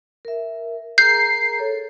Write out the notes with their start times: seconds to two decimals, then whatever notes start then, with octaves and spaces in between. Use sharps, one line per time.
0.25 A#4 E5
0.98 G#4 A#4 A#5 G6 C7
1.59 A4 C#5